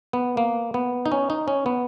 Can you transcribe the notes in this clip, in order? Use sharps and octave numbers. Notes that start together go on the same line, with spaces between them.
B3
A#3
B3
D#4
C#4
D#4
C#4
B3